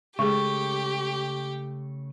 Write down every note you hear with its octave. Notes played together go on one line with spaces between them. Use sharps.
C#3 G#3 A3 G4 G#4 C#6